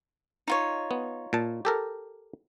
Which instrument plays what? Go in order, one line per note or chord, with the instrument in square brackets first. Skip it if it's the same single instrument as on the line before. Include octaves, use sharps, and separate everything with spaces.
[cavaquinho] D#4 F4 C#5
[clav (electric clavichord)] B3
A#2 A5
G4 A4 A#4